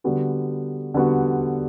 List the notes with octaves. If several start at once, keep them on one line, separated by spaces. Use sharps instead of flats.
D3 G3 B3 F#4
D3 G3 B3 F#4